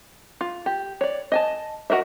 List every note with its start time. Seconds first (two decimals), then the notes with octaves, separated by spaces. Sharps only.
0.41 F4
0.66 G4
1.01 C#5 D5
1.32 D#5 G#5 A5
1.90 F#4 A#4 D#5 E5